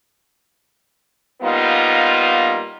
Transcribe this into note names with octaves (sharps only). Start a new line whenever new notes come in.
G3 A#3 B3 D#4 F4